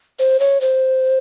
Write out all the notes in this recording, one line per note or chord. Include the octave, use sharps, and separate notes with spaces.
C5
C#5
C5